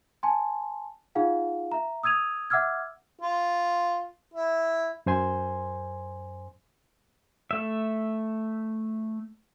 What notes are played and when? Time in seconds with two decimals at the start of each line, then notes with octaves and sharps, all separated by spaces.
0.23 G#5 A5 C6
1.15 D#4 F4 G#4 F5 F#5
1.72 E5 A#5
2.03 D#6 E6 G#6 D#7 F7
2.50 E5 F#5 D6 E6 F6 G#6
3.21 F4
4.34 E4
5.06 F#2 C5 G#5 C6
7.51 A3 E5